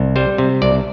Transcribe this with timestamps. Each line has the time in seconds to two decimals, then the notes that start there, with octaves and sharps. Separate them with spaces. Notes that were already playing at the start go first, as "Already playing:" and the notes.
Already playing: C2
0.16 G3 C5
0.38 C3
0.62 C2 D5